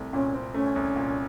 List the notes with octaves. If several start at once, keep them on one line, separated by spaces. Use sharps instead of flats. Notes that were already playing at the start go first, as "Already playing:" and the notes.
Already playing: C2 A3 C4
A#2 C#4
C4
A3 C#4
C2
A#2